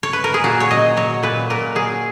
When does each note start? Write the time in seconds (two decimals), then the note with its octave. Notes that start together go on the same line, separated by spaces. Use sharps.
0.03 C#5
0.13 B4
0.24 A#4
0.34 G#4
0.44 A#2 F#4
0.60 C#5
0.71 F#3 D#5
0.97 F#3 C#5
1.23 A#2 B4
1.50 A#2 A#4
1.75 F#3 G#4